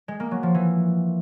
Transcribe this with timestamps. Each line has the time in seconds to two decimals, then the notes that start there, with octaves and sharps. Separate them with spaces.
0.08 G#3
0.20 A#3
0.31 F#3
0.43 F3
0.55 E3